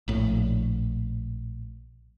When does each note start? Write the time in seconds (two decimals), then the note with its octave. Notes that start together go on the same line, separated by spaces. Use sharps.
0.08 A#1 A2